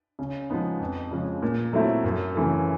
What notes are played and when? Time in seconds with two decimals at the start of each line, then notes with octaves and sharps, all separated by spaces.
0.19 C#3
0.49 F3 G#3 B3 D#4
0.80 F2
1.11 C#3 F3 G#3
1.42 A#2
1.73 F#3 A3 C4 E4
2.04 F#2
2.35 C#3 E3 A3